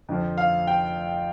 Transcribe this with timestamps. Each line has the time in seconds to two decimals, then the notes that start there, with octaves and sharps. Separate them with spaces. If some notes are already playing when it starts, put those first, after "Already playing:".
0.09 F2 D3 F3
0.38 F5
0.67 G5